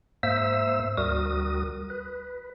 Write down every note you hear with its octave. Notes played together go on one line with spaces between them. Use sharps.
G#2 A#3 C5 E5 E6
D2 G3 F#4 A#4 D#6
B4